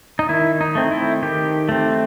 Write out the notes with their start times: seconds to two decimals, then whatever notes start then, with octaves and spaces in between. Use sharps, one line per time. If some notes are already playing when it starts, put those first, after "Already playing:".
0.19 D#4
0.29 D#3 E4
0.61 D#4
0.75 A3 C4
0.91 E4
1.22 D#3 G4
1.69 A3 C4